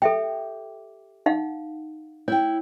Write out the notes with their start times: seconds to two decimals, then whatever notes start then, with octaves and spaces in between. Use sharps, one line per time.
0.02 G4 A4 E5 G5
1.26 D#4 F5 F#5
2.28 E4 C#5 G5